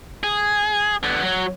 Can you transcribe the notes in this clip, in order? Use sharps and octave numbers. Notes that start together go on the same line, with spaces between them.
G#4
D3 B3
F#3